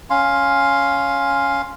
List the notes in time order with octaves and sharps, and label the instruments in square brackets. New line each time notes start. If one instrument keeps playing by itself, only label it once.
[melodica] C#4 F5 C6